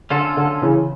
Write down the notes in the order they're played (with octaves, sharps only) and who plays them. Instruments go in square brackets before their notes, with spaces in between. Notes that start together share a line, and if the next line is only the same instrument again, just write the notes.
[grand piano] D3 [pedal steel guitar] C#4 F4 A4
[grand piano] D3
C#3 E3